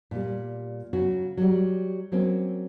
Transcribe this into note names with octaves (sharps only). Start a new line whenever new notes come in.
A#2 G3
C#3 F#3 C#4 F#4
F#3 G3
F#3 A#3 C4 C#4